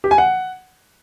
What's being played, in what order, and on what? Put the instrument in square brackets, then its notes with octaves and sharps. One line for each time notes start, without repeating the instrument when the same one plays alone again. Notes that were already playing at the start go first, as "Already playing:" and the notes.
[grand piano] G4
G#5
F#5